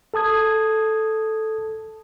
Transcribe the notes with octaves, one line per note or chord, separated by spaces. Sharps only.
A4 A5 D#6 G#6